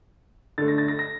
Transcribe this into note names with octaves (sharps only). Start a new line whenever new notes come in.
D3 A3 A6
A#6
A6
A#6
A#6